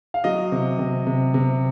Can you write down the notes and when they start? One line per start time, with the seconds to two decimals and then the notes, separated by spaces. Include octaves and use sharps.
0.14 F5
0.24 F#3 D#5
0.52 C3
0.79 C3
1.07 C3
1.34 C3